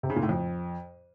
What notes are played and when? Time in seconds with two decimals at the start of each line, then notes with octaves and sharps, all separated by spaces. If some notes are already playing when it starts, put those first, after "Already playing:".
0.03 C3
0.10 C#3
0.16 A#2
0.23 A2
0.29 F2